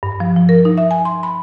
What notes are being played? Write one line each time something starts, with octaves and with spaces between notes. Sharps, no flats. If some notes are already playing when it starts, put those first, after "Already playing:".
G2
F3
F3
A#4
D#4
E5
G#5
C6
B5